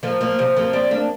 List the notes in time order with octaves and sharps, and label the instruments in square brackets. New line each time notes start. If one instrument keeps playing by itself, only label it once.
[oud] F3 A#3
F3 A#3
C3 F3
F3 A#3
G3 C4
A#3 D4